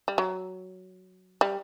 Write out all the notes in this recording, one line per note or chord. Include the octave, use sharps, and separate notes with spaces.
G3
F#3
G3